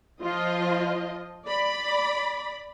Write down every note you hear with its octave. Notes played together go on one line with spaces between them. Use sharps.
F3 F4 D#5
D5 B5